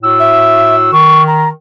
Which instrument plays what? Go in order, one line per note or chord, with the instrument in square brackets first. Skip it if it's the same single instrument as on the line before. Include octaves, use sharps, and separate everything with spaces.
[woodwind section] A2 F#4 E6
[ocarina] E5
[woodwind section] D#3 [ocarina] C#6
[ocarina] A#5